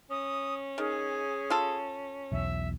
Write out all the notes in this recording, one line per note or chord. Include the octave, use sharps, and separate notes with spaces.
C#4 D#6
D#3 G#4
F4 A4
B1 E2 E5